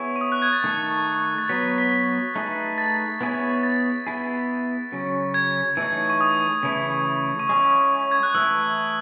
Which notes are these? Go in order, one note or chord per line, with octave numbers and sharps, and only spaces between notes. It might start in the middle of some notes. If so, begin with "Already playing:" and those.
Already playing: B3 E4 G#4 C#5
C#6
D#6
F#6
G#6
A6
D#3 A3 D#4 A4
A6
F#3 B3 F#4 B4 B6
B6
A3 D#4 G#4 B4
A6
B3 E4 G#4 C#5
A6
B3 E4 G#4
C#3 F#3 C#4
G#6
E3 A3 D#4 G#4 C#5
C#6
D#6
C#3 E3 A3 E4
C#6
G#3 C#4 E4 D#6
G#6
F#6
E3 A3 E4 E6